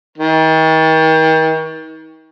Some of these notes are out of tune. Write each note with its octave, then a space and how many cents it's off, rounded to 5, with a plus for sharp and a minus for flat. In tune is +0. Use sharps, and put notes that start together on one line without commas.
D#3 +40